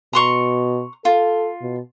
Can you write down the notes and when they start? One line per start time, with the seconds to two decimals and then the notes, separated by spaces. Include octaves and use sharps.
0.13 B2 A#5 C6 C#6
1.05 F4 A4
1.62 B2